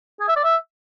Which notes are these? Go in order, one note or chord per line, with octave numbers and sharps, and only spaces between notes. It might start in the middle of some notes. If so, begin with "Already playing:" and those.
G#4
E5
D5
E5